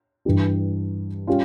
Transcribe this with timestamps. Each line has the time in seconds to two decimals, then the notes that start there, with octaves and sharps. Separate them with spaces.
0.25 G2 E3 G3 D4
1.27 G3 C#4 F4